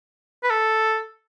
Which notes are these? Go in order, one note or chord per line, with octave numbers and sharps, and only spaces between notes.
B4
A4